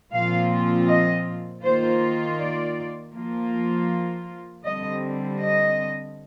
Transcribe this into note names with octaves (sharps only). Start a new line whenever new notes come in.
A#2 F3 C4 F4 F5
D#5
D#3 A#3 F4 C5
D5
F3 A#3 F4
D3 G3 C4 D#5
D#5